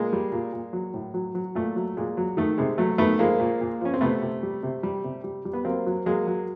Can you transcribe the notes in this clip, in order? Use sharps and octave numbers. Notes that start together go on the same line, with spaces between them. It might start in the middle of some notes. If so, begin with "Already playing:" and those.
Already playing: A#2 G#3 A#3
G3
A#2
A#2
F#3
A2
F#3
F#3
A#2 A3
F#3
A#2 G#3
F#3
D#3 A3
C3 G#3
F#3 A3
D#3 A3 B3
F3 G#3 A#3
A#2
A#2
F3 C#4
C4
C3 A3 B3
C3
G3
C3
G3
C3
G3
G3
B3
F#3 A#3 C4
F#3
F#3 G#3 A#3
F#3